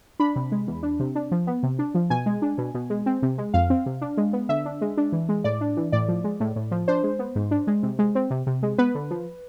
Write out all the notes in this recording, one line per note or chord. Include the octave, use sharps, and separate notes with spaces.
D4 B5
C3
G#3
E2
D4
C3
D4
F3
B3
C3
D4
F3
B2 G#5
G#3
D4
B2
B2
G#3
C4
C3
G#3
F2 F5
C4
C3
D4
G#3
B3
D3 E5
D4
G#3
D4
E3
G#3
A2 D5
D4
E3
A2 D5
F3
G#3
A2
A2
F3
D4 C5
G#3
B3
G#2
D4
G#3
C3
G#3
C4
C3
C3
G#3
B3 B4
D3
F3